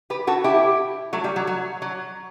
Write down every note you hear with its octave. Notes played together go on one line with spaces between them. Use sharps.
G4 B4
F#4 A4
E4 G4
F#3 A3
G3
F#3
F#3
F#3